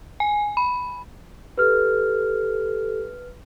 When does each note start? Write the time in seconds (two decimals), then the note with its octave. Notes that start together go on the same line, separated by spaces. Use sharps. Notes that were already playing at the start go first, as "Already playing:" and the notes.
0.20 G#5
0.57 B5
1.58 G4 A4 B4 F6